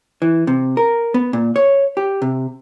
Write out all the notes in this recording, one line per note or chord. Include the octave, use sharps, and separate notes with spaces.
E3
C3
A#4
B3
A#2
C#5
G4
C3